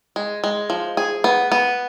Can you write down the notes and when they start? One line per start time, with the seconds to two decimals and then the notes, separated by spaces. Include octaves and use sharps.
0.16 G#3
0.44 G#3
0.70 F3
0.97 G#4
1.24 B3
1.52 B3